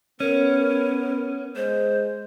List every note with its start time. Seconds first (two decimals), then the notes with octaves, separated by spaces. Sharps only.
0.20 B3 C#4 A#4
1.56 G#3 C5